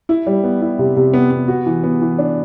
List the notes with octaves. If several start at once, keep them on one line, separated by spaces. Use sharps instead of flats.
E4
G3
B3
E4
C3
C3
B3
B3
F#4
E3
B3
E3
D4